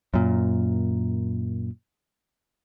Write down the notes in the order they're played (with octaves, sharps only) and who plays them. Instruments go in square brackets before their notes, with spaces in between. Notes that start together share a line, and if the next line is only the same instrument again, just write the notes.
[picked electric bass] F#2 A#2